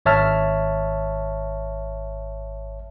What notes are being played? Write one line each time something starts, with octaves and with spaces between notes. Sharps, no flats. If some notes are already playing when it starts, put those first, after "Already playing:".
G#1 C#5 E5 A5 F6